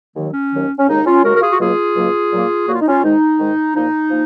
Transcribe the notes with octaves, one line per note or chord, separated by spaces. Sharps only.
D#2 D#3 F#3
C#4
D#2 D#3 F#3
C#4
D#2 C#3 G#3 D#4
C#4 F4
D#2 C#3 G#3 F#4 A#4
A#4
F4 G#4
F#4
C#2 B2 F#3 A#3 F4 G#4
C#2 B2 F#3 A#3
A#2 F#3 A#3
A#2 F#3 A#3 F#4
F4
D#4
C#4 F4
G#2 D#3 G#3 D#4
G#2 D#3 G#3
A#2 F3 A#3 D#4
F3 A#3